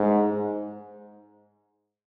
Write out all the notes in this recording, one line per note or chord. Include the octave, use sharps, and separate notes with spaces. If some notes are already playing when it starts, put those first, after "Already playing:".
Already playing: G#2